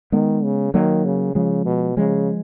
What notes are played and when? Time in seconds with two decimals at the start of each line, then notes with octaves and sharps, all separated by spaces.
0.12 D#3 G#3 B3
0.44 C#3
0.74 D#3 F#3 A#3
1.05 C#3
1.35 C#3 F3 G#3
1.66 B2
1.97 C#3 F3 G#3